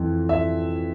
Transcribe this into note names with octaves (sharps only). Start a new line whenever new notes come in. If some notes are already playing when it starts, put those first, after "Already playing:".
Already playing: F2 E3
E5